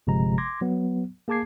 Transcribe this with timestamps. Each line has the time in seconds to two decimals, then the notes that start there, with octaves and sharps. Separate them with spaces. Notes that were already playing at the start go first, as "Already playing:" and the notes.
0.07 G1 C3 F3 G#3 A#5
0.38 C6 D6 G#6 A#6
0.61 F#3 B3
1.28 A#3 G#4 A5 D6 G#6 C7